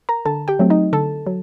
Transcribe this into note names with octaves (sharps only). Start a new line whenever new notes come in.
A#4 A#5
D3 A4 A5
G4 G5
F#3 A3 C4
D#4 D#5
D3 A4 A5
F#3